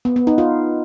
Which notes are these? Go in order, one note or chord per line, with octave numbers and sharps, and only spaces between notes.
B3
B3
D#4
F4